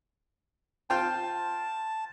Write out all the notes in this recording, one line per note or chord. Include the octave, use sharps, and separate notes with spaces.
F4 C5 G5 A5